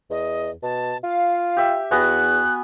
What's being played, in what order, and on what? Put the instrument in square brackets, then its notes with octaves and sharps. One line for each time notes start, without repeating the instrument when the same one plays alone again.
[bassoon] E2 [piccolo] D#5
[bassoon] B2 [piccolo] A5
[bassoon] F4 [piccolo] F5
[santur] G4 E5
[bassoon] E2 [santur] B3 F#4 G#5 [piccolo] F#6